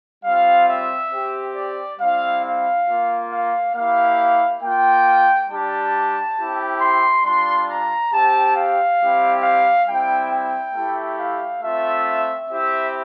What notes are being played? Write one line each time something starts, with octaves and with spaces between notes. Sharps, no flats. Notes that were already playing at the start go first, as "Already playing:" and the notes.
G3 C4 F4 F5
E5
C4 G4
D5
G3 C4 E4 F5
F5
A#3 F4
F5
A#3 E4 G4 F5
A#3 F4 G5
G3 D4 G4 A5
C4 E4 G4
C6
G3 D4 F4 C6
A#5
C4 G4 A5
F5
G3 C4 E4 G4
F5
G3 C4 E4 G5
G5
A3 E4 G4
F5
A3 C4 F4 E5
C4 E4 G4 E5